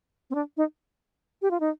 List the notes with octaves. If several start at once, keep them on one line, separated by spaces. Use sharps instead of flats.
C4
D4
D#4
G4
F4
D#4